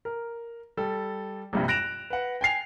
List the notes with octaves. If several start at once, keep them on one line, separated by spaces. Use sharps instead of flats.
A#4
G3 A4
A#1 G2 C3
F#6 A#6 D7 E7 F7
B4 F#5
G5 G#5 C7 F7